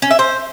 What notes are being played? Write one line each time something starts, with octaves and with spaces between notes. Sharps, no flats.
C#4
E5
C5